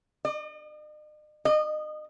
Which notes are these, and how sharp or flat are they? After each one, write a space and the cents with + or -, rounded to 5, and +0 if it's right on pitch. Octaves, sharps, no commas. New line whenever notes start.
D#5 -45
D#5 -30